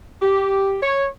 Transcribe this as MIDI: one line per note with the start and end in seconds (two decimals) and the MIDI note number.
0.22 0.76 67
0.83 1.05 73